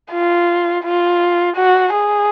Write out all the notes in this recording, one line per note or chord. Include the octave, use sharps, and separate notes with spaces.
F4
F4
F#4
G#4